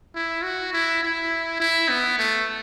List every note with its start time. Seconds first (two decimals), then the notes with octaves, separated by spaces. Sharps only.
0.15 E4
0.43 F#4
0.73 E4
1.03 E4
1.60 E4
1.89 B3
2.19 A3